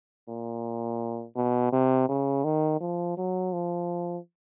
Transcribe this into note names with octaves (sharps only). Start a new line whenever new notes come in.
A#2
B2
C3
C#3
D#3
F3
F#3
F3